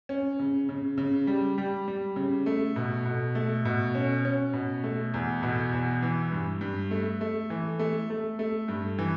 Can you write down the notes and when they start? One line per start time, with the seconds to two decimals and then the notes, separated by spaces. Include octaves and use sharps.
0.09 C#4
0.39 C#3
0.69 C#3
0.98 C#3
1.27 G3
1.58 G3
1.88 G3
2.16 C#3
2.46 A3
2.76 B2
3.05 B2
3.35 A3
3.65 B2
3.95 C#4
4.25 C#4
4.53 B2
4.84 A3
5.14 E2
5.43 B2
5.73 E2
6.02 E3
6.32 G2
6.61 G2
6.91 A3
7.21 A3
7.50 E3
7.79 A3
8.10 A3
8.39 A3
8.68 G2
8.98 E3